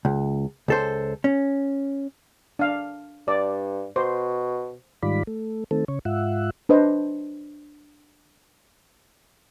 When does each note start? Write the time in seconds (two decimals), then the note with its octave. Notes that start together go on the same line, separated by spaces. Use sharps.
0.05 C#2
0.68 C#2 A4 C5
1.24 C#4
2.59 D4 F5
3.28 G2 D5
3.96 B2 C5
5.03 G#2 D#3 G3 F4 D5 B5
5.27 A3
5.71 D#3 A3 C4 A4
5.88 C#3 C#5
6.05 G#2 F4 E5 F#5
6.69 D4 B4 C5 D#5